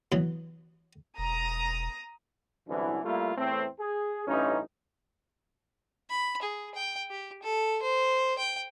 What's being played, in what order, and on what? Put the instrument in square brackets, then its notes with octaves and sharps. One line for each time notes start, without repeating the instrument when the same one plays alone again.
[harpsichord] B2 E3 F#3
[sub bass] E1 [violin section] A#5 D#6
[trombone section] C2 F#2 D3 E3
G3 A3 A#3 E4 F4
E2 A2 A3 C4
G#4
A1 G2 C#4 D#4
[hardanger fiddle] B5
G#4
G5
G4
A4
C5
G5